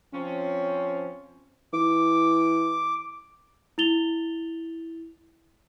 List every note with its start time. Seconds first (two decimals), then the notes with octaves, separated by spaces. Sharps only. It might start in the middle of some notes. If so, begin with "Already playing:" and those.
0.13 F3 C4 C#4
1.73 E3 D6
3.78 E4 A6 F7 G7